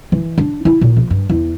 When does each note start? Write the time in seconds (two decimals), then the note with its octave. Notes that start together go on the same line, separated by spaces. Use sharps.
0.12 E3
0.38 D4
0.65 E4
0.81 A#2
0.97 A#1
1.10 G2
1.30 E2